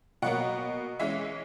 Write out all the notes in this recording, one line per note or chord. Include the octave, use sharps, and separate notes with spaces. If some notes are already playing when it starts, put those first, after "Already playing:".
B2 F#3 A#3 F#5
E3 G#3 C#4 E5